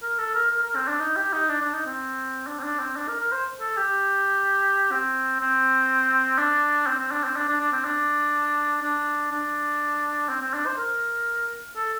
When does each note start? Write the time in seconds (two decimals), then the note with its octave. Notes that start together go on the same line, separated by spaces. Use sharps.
0.03 A#4
0.19 A4
0.35 A#4
0.51 A#4
0.63 A#4
0.76 C4
0.88 D4
1.00 D#4
1.16 G4
1.33 D#4
1.49 D4
1.61 D4
1.74 D#4
1.86 C4
2.47 D4
2.59 C4
2.63 D4
2.79 C4
2.96 D4
3.08 A#4
3.20 A#4
3.32 C5
3.61 A4
3.77 G4
4.91 C4
5.40 C4
6.38 D4
6.87 C4
6.99 C4
7.12 D4
7.24 C4
7.36 D4
7.48 D4
7.60 D4
7.73 C4
7.85 D4
8.83 D4
9.32 D4
10.29 C4
10.42 C4
10.54 D4
10.66 C5
10.78 A#4
11.76 A4